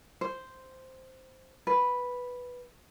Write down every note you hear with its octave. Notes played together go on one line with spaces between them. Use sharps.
C5
B4